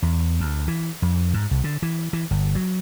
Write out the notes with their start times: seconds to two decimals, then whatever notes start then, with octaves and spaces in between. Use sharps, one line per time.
0.02 E2
0.40 D2
0.68 E3
1.02 F2
1.34 G#2
1.51 C2
1.64 D3
1.82 E3
2.13 E3
2.31 G1
2.55 F#3